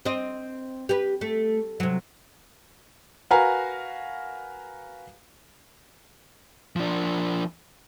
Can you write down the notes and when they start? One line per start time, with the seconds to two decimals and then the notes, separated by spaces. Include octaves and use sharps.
0.05 C4 D#5
0.89 G4 B4
1.21 A3
1.80 C3 F#3
3.31 F#4 A#4 B4 F5 G#5 A#5
6.76 F3 D4